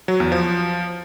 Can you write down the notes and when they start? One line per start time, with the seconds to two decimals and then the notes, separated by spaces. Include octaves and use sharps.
0.08 F#3
0.20 E2
0.32 F3